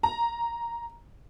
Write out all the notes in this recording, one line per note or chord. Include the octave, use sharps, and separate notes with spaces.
A#5